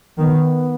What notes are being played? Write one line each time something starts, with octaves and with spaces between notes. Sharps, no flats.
D#3 B3